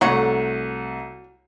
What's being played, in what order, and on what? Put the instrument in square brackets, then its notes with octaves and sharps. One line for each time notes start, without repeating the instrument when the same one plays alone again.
[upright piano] C2 A3 [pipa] F#3 F#5 C#6